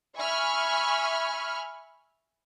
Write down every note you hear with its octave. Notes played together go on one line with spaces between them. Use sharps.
E5 G#5 B5 C#6 F6